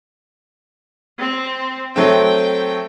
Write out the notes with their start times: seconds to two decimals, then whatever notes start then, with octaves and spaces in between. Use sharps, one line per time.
1.20 C4
1.96 F#3 A3 C4 G5